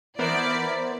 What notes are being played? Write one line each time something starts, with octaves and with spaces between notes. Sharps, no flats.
E3 B3 E4 A#4 C5 D5